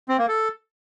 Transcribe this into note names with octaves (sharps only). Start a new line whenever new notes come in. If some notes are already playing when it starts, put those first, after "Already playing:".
C4
A#3
A4